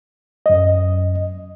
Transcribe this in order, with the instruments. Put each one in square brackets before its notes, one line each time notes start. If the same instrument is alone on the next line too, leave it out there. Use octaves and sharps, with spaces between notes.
[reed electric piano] F#2 D#5